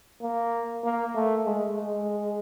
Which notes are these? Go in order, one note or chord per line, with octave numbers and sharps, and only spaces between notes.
A#3
A#3
A3
G#3
G#3